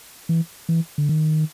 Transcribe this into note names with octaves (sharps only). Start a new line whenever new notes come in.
E3
E3
D3
D#3